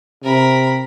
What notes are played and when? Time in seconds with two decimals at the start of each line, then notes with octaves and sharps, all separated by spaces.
0.23 C3 A#4 B5